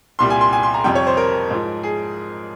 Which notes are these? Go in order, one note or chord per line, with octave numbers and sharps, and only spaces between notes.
C2 A#2 G3 C6
G#5
C6
G#5
C6
A#5
F2 C3 G3 G5
C#5
C5
A#4
G#2 F3
G#4